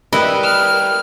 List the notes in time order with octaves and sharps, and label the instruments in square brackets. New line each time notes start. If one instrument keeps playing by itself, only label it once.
[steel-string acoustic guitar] G3 [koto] E4 B4 D#5 [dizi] A#4
[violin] F6